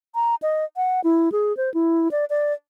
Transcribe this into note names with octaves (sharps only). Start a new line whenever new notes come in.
A#5
D#5
F#5
E4
G#4
C5
E4
D5
D5